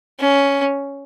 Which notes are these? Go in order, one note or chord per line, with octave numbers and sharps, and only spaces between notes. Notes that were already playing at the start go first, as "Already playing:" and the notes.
C#4